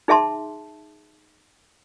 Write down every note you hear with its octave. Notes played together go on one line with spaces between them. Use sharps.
D#4 G#4 E5 A5 C6